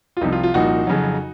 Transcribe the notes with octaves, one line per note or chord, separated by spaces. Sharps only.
F4
C2 C3 F3 D#4
F4
F4
C2 A#2 F3 D#4 F#4
F2 C#3 F#3